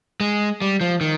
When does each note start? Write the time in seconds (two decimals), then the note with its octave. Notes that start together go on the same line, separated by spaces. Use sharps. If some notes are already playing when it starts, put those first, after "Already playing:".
0.20 G#3
0.61 G3
0.81 F3
1.01 D#3